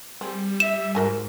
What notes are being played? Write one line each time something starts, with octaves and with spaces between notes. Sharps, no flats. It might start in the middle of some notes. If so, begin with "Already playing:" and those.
G3 C4 G#4
E5 E7
G#2 F#4 A#4 G#5